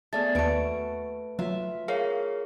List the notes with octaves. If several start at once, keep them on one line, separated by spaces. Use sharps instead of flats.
A3 B3 G#4 D5 A6
D#2 A3 F#4 B4 D7
F#3 F4 E5
G#4 A#4 C#5 F5